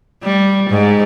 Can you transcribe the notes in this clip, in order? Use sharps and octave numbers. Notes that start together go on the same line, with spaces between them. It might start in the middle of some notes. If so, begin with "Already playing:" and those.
G3
G#2